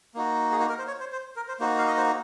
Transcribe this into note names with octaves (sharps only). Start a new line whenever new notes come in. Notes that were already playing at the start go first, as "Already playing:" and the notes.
A#3 D#4 F#4
G#4
F#4
A#4
C5
C#5
C5
C5
A#4
C5
A#3 D#4 F#4 C5
F5
D#5
C5